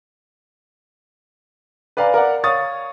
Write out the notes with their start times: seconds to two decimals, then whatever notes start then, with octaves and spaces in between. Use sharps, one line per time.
1.97 B4 D5 F5 G#5 A#5
2.14 A#4 D5 F#5
2.44 C#5 F5 C#6 D#6 A6